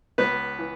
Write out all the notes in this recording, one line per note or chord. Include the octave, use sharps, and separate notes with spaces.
C#2 B3 B4
E3